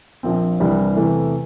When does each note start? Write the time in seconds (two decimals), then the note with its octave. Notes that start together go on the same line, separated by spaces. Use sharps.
0.23 A#1 A#2 F3 C4
0.60 C2 C3 E3 G3 D4
0.96 E2 C3 E3 A3